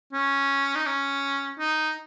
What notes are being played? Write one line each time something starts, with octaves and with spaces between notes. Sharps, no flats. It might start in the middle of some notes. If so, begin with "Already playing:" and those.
C#4
D#4
C#4
D#4